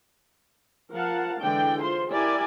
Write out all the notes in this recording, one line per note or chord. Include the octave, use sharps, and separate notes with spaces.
F3 A#4 F5 F#5 A5
D3 E3 G#3 D4 D5 G5
F4 C5 C6
E4 G4 A#4 D5 G#5